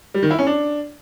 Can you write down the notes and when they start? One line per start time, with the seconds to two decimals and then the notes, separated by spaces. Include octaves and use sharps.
0.14 G3
0.22 D#3
0.31 E4
0.39 C#4
0.47 D4